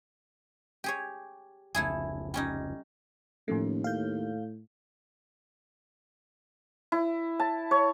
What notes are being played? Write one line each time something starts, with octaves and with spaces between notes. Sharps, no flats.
G4 G#4 C#5
F1 C#2 A3 E4 G#4
G3 C#4 D#4
D#2 A2 F3 A3 C#4
A2 F5 G6
E4
A5
C#5